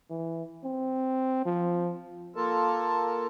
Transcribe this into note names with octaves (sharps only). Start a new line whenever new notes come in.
E3
C4
F3
A#3 F4 A4 A#4 A5